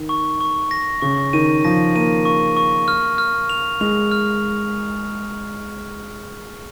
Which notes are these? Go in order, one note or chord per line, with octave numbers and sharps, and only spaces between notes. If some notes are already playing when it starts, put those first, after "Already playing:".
Already playing: D#3
C#6
C#6
A#6
C#3 C#6
D#3 D#7
F3 A#6
A#3 D#7
C#6
C#6
F6
F6
F7
G#3 F7
F6